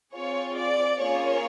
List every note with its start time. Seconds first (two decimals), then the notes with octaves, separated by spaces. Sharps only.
0.13 C4 F4 G#4 C#5
0.56 D5
1.00 A#3 C#4 F4 G#4 C#5